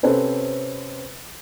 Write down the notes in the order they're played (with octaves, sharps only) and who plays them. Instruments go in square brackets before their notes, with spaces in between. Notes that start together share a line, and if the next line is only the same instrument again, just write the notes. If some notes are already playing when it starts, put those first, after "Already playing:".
[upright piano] C3 C4 C#4 A4 B4 C5